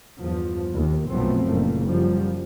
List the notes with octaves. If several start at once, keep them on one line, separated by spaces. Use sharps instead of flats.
E2 G2 F3
D#2
B1 F#2 F3 A3 B3 C4
F#1 A#2 A3 A#3
F#2 C#3 F3 G3